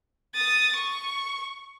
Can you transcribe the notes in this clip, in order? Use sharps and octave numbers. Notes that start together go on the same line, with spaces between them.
D#6 A6
C#6